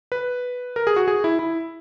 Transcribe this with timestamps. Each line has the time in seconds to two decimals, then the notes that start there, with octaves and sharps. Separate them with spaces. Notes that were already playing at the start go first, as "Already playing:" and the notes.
0.12 B4
0.76 A#4
0.87 G#4
0.96 F#4
1.08 G#4
1.24 E4
1.39 E4